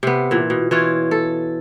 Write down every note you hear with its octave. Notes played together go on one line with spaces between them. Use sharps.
C3 B3
A#2 E3
B2
E3 F4 C#5
A4